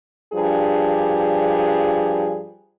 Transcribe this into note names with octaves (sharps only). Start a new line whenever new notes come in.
G2 F3 D4 G#4